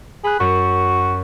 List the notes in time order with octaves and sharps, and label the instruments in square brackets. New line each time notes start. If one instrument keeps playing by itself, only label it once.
[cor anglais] G#4 [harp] B5 F#6
[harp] F#2 [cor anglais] F#4